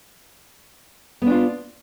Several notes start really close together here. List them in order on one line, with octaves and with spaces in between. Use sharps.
B3 D4 F4